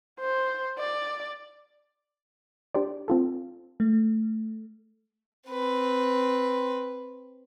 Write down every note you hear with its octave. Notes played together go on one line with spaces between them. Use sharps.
C5
D5
D4 G4 C5 D5
C4 F4 A4
A3
C4 B4